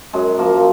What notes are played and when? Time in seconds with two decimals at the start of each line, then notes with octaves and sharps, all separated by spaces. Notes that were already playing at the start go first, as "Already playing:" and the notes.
0.13 F#2 G#3
0.39 F3 A#3